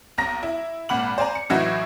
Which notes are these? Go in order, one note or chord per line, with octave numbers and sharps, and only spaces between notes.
B1 A#5 A#6
E4
G#1 A#2 F#5 B5 F#7
C5 D5 G#5 A#5
C#7
A2 E3 F#3 D#4 E4 F#4